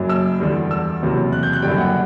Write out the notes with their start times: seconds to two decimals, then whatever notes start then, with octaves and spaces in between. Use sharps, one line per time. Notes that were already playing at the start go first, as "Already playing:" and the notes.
Already playing: F#1 F#2 F#3
0.09 E6
0.40 E2 D3 G3
0.71 E6
1.02 F#1 E2 C3 F#3
1.32 F#6
1.43 G6
1.53 F#6
1.62 F#1 F#2 D3 G3 G5
1.78 F#5